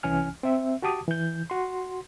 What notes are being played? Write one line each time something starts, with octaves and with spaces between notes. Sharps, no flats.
C2 E3 C#4 G#5 F6
C4 E5
F#4 G4 A5 D6 D#6
E3 G6
F#4 C6